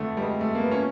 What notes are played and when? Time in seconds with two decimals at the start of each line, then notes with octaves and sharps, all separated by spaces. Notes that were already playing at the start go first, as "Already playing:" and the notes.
Already playing: F2 D3 A3
0.17 G3
0.22 G#3
0.41 A3
0.55 A#3
0.60 B3
0.71 C#4